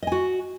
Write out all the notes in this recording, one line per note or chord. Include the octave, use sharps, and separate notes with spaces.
F#4 D#5 G#5